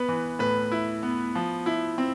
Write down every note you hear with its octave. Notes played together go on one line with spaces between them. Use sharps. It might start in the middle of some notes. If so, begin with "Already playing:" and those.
Already playing: B3 B4
E3
A2 B4
E4
B3
F3
E4
C4